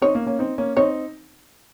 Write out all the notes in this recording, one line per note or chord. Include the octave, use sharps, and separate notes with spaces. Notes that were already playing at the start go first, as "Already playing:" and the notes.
C4 D#4 C#5
A#3 C#4
A#3 C#4
C4 D#4
A#3 C#4
C4 D#4 C#5